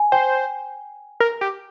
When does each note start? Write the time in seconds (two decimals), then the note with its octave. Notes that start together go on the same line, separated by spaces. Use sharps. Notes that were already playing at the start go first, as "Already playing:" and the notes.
Already playing: G#5
0.12 C5 G5
1.20 A#4
1.41 G4